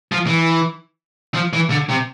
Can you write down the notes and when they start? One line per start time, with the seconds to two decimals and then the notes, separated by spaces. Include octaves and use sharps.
0.12 F3
0.27 E3
1.34 F3
1.53 E3
1.70 D3
1.89 C3